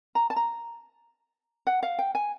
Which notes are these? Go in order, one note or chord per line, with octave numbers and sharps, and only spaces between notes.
A#5
A5
A#5
F#5
F5
G5
G#5